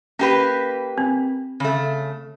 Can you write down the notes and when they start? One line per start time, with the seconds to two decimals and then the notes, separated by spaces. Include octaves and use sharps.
0.19 A#3 C#4 G4 B4
0.98 C4
1.60 C#3 A3